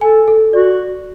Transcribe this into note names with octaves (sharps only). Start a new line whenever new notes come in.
A4 G#5
A4
F#4 D5